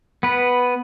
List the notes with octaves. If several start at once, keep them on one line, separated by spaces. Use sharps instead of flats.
B3 B4